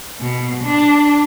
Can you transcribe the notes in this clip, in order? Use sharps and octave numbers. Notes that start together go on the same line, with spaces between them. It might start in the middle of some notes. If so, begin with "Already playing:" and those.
B2
D4